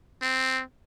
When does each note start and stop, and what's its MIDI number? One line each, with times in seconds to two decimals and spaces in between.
0.22 0.62 60